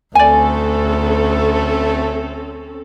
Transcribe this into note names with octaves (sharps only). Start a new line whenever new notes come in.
D2 A3 C4 C#4 A4 D5 G#5